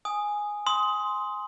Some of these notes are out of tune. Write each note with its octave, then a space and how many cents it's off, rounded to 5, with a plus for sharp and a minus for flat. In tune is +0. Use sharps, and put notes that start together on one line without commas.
G#5 +0 D#6 -5
C6 +0 D#6 +20